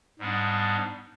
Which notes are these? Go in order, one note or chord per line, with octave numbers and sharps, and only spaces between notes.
G#2 G3 B3 D4